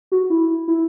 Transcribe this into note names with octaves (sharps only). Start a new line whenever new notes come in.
F#4
E4
E4